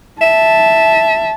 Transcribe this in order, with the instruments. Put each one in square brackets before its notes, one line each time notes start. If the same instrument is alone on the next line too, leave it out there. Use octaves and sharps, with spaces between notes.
[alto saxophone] E5 [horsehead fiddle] A5